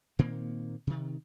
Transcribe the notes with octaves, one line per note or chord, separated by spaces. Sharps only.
A#2 D#3 A#3 C4
C3 D#3